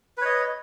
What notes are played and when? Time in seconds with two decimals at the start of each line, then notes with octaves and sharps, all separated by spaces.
0.18 B4
0.21 C#5
0.25 D#5